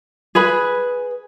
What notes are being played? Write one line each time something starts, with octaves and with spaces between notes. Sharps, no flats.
G#4 B4 B5